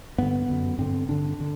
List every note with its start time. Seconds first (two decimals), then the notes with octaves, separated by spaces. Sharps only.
0.18 G2 D3 B3
0.49 F#2 D3
0.78 G2 D3 C4
1.08 G2 D3 D4
1.40 D3